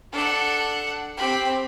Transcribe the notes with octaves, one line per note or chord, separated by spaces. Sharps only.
D4 A4 F#5
C4 G4 B5